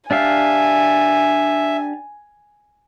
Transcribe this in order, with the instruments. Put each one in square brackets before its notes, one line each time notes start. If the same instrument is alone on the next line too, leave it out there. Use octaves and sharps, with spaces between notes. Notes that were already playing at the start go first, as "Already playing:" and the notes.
[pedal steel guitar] D4 G4 F5 [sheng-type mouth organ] E5 [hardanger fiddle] G#5